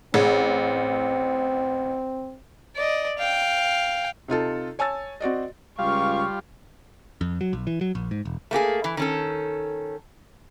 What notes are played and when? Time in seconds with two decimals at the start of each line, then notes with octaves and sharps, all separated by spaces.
0.14 A1 C4 G#4
2.76 D5 D#5
3.18 F5 G5
4.28 C3 D#4 F4 A4
4.79 C#5 G#5 A5 E6 A6
5.20 C4 F#4 D5 D#5
5.79 C#2 G3 F4 F5 C#6
7.21 F2
7.41 F#3
7.53 B1
7.67 E3
7.81 F#3
7.95 A#1
8.11 G#2
8.25 E1
8.51 A3 A#3 G4 G#4
8.84 E3
8.97 D#3 C#4 A4